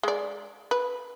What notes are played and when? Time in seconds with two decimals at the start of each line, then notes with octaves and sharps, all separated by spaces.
0.03 G#3 D5
0.71 B4